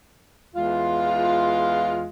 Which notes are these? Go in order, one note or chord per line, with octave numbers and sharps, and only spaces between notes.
E2 G#3 F4